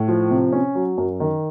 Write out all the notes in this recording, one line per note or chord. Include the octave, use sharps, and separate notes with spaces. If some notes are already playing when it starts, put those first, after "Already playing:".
Already playing: A2
F3
C3
C#4
F#3
F#2
D#3